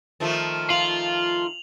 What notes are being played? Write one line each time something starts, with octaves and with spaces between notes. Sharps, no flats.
D#3 F3 A3
F4 F7 F#7